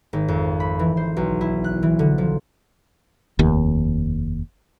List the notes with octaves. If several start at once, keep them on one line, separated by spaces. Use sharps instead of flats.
G#1
F2
B5
E3
C5
B1
E4
F#6
E3
D3
F3
F1 D#2